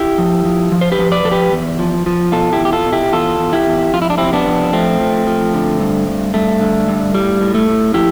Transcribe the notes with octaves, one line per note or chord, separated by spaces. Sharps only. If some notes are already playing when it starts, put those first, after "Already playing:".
Already playing: E4 G4
F3
F3
F3
C5
G4 B4
F3
B4 D5
F3 A4
G4 B4
E2
F3
F3
B2 F4 A4
E4 G4
E2
G4
F4 A4
B2
E4 G4
E2 F4 A4
E2
E4 G4
E2
F2 F4
E4
D4
C3 C4 E4
B3 D4
F2
F3 A3 C4
F3
F3
D3
G2
G2
G2 A3
D3
G2
A2 G3
A2
A3
A2
F3 E4 G4